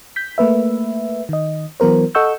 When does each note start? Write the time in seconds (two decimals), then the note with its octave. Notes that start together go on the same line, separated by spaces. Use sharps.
0.16 G6 B6
0.38 A3 A#3 B4 E5
1.29 D#3 D#5
1.80 E3 F#3 B3 A#4 C5
2.15 A4 D#5 F#5 C#6 E6 G6